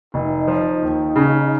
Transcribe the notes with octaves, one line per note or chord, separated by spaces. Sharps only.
F1 D#4
F3
D#2
C#3